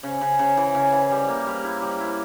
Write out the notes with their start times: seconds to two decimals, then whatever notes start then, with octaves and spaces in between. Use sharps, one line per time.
0.03 C#3
0.21 C#3
0.39 C#3
0.57 E3
0.75 C#3
0.92 E3
1.11 G3
1.28 A#3
1.47 G3
1.64 E4
1.82 G3
2.00 E4